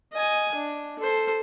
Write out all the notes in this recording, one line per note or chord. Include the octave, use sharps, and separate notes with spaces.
D#5 G#5
D4
A4 C5